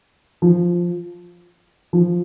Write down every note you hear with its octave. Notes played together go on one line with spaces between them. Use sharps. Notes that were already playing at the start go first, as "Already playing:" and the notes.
F3
F3